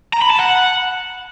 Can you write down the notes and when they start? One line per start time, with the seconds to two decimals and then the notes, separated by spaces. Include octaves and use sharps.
0.13 A#5
0.22 B5
0.31 A5
0.39 F#5